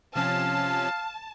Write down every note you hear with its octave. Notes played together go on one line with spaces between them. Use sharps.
C3 F3 C#4 F5 A5